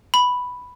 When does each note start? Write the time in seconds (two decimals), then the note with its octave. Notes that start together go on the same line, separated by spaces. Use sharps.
0.14 B5